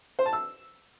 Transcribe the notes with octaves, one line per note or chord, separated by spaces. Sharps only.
C5
A5
E6